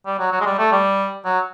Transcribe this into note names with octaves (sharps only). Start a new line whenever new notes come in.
G3
F#3
F#3
G#3
G3
A3
G3
F#3